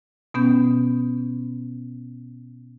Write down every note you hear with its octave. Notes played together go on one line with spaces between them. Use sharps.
B2 B3 C#4 G6